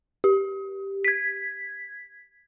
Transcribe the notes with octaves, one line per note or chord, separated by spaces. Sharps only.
G4
G#6 B6